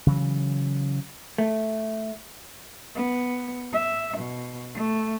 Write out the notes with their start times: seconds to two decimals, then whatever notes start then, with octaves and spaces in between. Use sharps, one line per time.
0.07 C#3 E3 F#3
1.38 A3
2.95 B3
3.72 E5
4.17 B2
4.74 A3